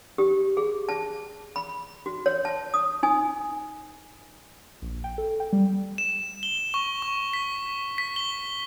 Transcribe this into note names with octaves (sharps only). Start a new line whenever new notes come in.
G4
G#4
A5
B5
F#4
C#5
A5
D#6
D#4 G#5 D#6
A#1
G5
A4
G5
G3
E7
G7
C#6
C#6
B6
B6
G7